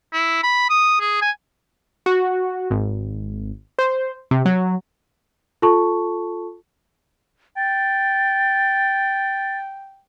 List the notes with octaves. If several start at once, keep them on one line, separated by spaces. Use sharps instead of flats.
E4
B5
D#6
G#4
G#5
F#4
G#1
C5
C3
F#3
F4 A4 A5 C#6
G5 A6